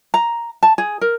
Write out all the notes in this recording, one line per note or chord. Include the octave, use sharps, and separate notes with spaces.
A#5
A5
G#4
A#4